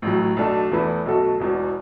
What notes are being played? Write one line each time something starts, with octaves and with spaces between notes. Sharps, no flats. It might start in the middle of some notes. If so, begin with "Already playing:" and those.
A1 A2 F#3
B1 B2 A3 D4 A4
E2 E3 A3 E4 B4
B1 B2 A3 F#4 A4
E1 E2 B2